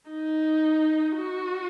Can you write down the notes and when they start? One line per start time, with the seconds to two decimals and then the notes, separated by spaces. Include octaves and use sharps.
0.10 D#4
1.17 F#4